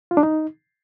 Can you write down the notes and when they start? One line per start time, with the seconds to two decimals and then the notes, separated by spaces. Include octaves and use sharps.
0.11 F4
0.17 D4
0.23 D#4